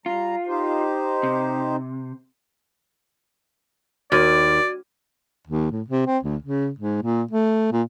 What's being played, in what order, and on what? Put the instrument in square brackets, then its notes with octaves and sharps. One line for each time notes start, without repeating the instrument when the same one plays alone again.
[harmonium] G3 A#5 [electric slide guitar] F4
[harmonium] D#4 G4 C5
[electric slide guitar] C3
[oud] D#2 [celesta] F#4 G#6 D#7 [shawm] D5
[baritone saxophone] D#2
A2
C3
C4
D2
C#3
G#2
A#2
A3
A#2